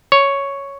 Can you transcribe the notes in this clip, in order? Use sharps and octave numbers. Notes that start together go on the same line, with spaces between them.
C#5